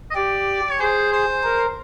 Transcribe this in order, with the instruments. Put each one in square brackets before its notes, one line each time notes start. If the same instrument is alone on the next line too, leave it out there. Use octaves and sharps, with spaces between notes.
[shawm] D#5
[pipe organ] G4 [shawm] D5
[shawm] C#5
[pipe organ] G#4 [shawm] C5
[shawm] C5
[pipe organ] A#4